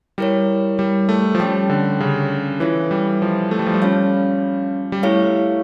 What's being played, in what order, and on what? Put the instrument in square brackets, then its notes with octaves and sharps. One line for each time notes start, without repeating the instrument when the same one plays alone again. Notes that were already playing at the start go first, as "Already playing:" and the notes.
[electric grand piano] G3 [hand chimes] E4 A#4 C#5
[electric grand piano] G3
A3
F3
[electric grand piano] G3 [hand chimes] C#4 G4 C#5 G5
[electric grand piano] D3
C#3
[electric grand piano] E3 [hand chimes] F4 A4 C#5 E5
[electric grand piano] G3
F3
A3
G3
F3
G3
[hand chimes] C#4 F4 C#5 F5
[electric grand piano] G3
[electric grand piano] A3 [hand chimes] E4 G4 C#5 F5